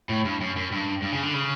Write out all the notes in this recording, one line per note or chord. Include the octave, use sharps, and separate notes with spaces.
A2
G2
F#2
F#2
G2
G2
C#3
D3
C#3